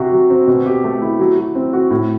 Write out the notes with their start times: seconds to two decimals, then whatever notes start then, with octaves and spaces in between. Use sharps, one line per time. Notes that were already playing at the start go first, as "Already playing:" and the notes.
Already playing: C3 F#4
0.12 F#3
0.30 C4
0.47 B2
0.66 G4
0.84 A3
1.02 E4
1.19 F#3
1.37 F#3
1.55 C4
1.73 F#4
1.91 A2